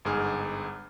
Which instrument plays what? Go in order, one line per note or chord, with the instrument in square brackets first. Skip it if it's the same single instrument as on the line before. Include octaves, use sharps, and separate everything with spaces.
[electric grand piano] G1 G#2 G#4 F6